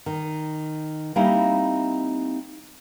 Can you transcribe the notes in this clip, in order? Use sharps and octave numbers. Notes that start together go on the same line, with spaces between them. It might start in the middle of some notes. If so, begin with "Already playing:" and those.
D#3
G3 A#3 C4 D#4 E4